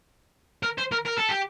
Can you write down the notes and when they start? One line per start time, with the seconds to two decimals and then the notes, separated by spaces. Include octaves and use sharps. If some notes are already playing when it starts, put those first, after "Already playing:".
0.63 A#4
0.78 C5
0.92 A#4
1.05 A#4
1.18 A4
1.29 G4